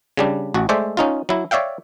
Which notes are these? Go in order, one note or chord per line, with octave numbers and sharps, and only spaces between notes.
C#3 G3 D4
A1 F#4
G#3 A3 C5 D5 E5
C#4 D#4 F4
F#3 E4
C#5 D5 E5 F5 G5